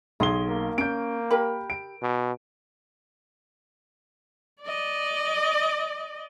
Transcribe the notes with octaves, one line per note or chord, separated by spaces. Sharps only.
B1 G#4 C6 G7
A#3
C#4 G6 D7
G4 A#4 B5
D7
B2
D5 D#5